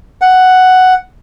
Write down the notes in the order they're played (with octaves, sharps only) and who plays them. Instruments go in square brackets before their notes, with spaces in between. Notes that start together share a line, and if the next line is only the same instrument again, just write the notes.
[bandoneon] F#5